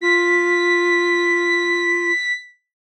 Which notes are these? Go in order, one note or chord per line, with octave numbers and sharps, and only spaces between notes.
F4 B6